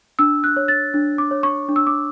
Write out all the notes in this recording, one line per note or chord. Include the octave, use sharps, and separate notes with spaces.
D4 E6
F#6
C#5
A6
D4
D6
C#5
C#6
D4
E6
D6